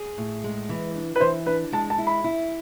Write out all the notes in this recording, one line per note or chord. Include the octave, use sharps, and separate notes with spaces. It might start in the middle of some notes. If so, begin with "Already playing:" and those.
Already playing: G#4
A2
G#3
E3
D4
B4
E3 C5
D4 B4
G#3 A5
A5
E4
B5
E4